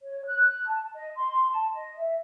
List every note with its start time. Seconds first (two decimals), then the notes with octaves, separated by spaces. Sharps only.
0.02 C#5
0.25 F#6
0.68 A5
0.94 D#5
1.16 C6
1.51 A5
1.74 D#5
1.98 E5